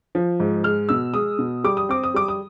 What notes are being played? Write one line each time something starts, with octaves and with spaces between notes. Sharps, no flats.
F3
G#2
G#3 F6
B2 E6
G#3 D#6
B2
G3 D6
D#6
C4 D6
D#6
G3 D6
D#6